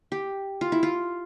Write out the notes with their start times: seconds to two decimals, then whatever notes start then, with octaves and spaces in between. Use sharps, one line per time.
0.12 G4
0.61 F4
0.72 E4
0.83 F4